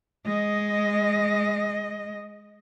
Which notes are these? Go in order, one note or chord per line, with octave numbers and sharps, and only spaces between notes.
G#3 D#5